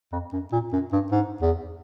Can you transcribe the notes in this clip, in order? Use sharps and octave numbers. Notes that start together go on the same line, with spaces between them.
F2
F#2
A#2
F#2
G2
G#2
E2